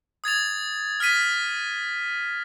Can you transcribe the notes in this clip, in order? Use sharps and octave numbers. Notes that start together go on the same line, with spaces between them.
D#6 G#6 A6 F7
F6 A6 B6 D#7